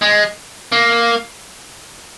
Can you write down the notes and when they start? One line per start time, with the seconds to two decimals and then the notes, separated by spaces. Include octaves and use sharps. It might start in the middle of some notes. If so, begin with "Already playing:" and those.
0.02 G#3
0.72 A#3